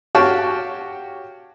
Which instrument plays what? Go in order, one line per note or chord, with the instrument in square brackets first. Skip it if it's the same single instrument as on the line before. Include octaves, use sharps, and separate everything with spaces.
[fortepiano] F#4 G4 C#5 F5 G5 A5